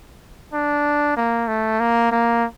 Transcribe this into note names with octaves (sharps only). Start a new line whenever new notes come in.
D4
A#3
A3
A#3
A#3